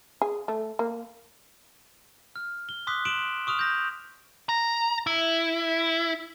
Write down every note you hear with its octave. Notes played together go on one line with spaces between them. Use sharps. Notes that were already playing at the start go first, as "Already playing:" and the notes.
G#4
A3
A#3
F6
G7
C6 D6 D#6 F#6 B6
C6 D7 E7 F#7
C#6 D#6 F6 F7
G6 A#6
A#5
E4